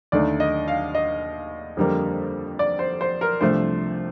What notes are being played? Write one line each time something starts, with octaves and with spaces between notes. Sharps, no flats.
D#2 D3 A3 D#4 D5
D#5
F5
D#5
F2 D3 G3 A#3
D5
C5
C5
A#4
C2 C3 F3 A3 D4 C5